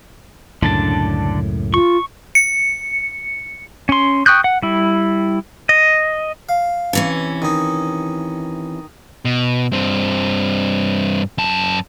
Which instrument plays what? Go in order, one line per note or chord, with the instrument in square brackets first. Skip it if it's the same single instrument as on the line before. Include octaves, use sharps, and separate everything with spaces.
[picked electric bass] C#2 F#2 A2 [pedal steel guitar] D3 D4 A5
[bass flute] F4 [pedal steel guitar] C#6
[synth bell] C#7
[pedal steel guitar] C#4 C6
G5 C#6 D#6 F#6 G6
F#5
G3 E4
D#5
[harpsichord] F5
[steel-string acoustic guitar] C3 E3 C#4
[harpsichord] D#3 D#4
[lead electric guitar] B2
G2 C4
F#2 A5